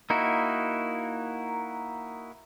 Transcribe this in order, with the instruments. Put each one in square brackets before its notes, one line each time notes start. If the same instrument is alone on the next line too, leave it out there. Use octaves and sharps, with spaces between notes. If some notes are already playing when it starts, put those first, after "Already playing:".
[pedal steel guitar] A#3 D#4 E4 F#4